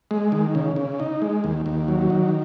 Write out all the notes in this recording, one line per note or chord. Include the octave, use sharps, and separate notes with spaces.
G#3
D#3
C#3
C#3
D#4
G#3
D#2
D#2
F#3
D#3